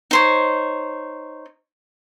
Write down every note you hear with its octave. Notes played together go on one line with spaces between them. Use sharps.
D#4 C5 C#5